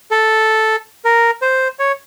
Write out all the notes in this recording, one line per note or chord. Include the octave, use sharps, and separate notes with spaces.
A4
A#4
C5
C#5